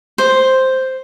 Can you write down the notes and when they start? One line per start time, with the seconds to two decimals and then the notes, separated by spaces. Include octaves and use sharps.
0.18 C5